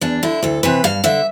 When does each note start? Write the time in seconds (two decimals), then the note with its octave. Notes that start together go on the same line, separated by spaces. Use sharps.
0.01 E2 D4
0.23 D3 E4
0.43 D2 A4
0.63 C3 E3 B4
0.84 G2 F5
1.04 D3 E5